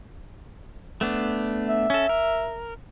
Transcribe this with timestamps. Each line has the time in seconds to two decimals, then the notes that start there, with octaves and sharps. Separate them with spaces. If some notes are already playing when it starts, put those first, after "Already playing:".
1.01 A3 B3 D4
1.67 E5
1.90 C#4 A4
2.09 A#4